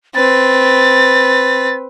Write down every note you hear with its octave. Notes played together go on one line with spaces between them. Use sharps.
C4 B4 A6